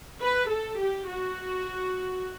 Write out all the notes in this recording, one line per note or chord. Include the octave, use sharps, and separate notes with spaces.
B4
A4
G4
F#4